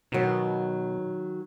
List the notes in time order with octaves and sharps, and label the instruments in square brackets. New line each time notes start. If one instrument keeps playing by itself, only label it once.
[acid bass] B2 [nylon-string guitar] D#3 F#3